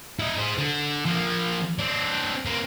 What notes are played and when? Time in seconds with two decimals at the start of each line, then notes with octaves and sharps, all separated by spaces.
0.19 E4 D#5
0.38 G#4 C5
0.58 D3
1.05 F3 A#3
1.79 C4 D4
2.46 A#3 C4